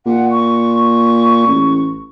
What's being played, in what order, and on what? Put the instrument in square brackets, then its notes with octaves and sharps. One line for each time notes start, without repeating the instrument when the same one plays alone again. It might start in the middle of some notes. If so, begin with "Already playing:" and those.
[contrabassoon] A#2 [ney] F#5
[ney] C#6
[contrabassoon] A1